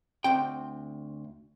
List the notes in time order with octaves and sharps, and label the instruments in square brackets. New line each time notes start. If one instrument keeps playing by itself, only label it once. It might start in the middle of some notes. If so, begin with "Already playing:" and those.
[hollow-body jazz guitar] D2 C4 G5